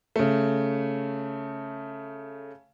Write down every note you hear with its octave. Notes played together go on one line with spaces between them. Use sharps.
C#3 A3